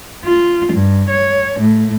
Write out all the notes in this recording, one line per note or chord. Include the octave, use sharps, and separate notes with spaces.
F4
G2
C#5
A2